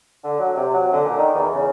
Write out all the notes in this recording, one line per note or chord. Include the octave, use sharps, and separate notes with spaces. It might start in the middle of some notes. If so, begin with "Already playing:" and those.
D3
F#3
C3
F#3
D3
A#2
D#3
E2
C#3